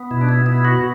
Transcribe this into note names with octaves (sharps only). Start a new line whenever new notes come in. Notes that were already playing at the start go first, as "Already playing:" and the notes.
Already playing: B3
B2 E4
D4
E4
B3 E4
F#4